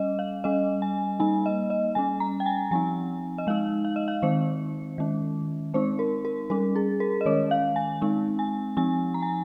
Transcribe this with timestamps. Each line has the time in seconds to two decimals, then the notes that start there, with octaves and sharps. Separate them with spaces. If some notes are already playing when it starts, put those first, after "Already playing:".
Already playing: G3 C#4 D#5
0.19 F5
0.44 G3 C#4 D#5
0.82 G#5
1.20 G3 A#3 D#4 G#5
1.46 D#5
1.70 D#5
1.95 G3 C#4 G#5
2.20 A#5
2.40 G5
2.46 G#5
2.71 F3 C4 D#4 G#5
3.38 D#5
3.47 G#3 D#4 F5
3.85 F5
3.96 D#5
4.08 F5
4.22 D#3 G#3 C4 D#4 C5
4.98 D#3 G#3 C#4
5.74 G#3 C4 D#4 C5
5.99 A#4
6.25 A#4
6.50 G3 C#4 A#4
6.76 G#4
7.00 A#4
7.21 D#5
7.26 D#3 G#3 C#4 C#5
7.51 F5
7.76 G#5
8.01 G#3 C4 D#4
8.39 G#5
8.77 F3 C4 D#4 G#5
9.14 A#5
9.22 G#5